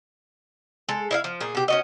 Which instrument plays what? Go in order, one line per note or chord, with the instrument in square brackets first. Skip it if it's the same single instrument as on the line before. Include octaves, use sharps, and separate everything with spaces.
[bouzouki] G#3 A4
E4 D#5 F5
F3
A#2 G#4
B2 G4
C#4 F#4 D#5